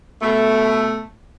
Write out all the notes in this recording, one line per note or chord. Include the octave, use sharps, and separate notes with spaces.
B2 A3